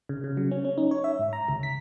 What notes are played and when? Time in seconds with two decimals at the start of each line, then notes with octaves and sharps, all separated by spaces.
0.09 C#3
0.24 C#3
0.37 F#3
0.51 C#4
0.65 C#4
0.78 D#4
0.91 C#5
1.04 E5
1.19 G#2
1.33 A#5
1.48 C#2
1.63 B6